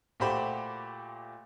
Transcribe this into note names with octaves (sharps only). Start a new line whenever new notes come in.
A#2 A3 F#4 G4 C5 B5